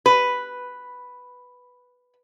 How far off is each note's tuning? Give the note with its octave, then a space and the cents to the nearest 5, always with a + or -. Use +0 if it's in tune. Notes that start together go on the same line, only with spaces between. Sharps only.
B4 +0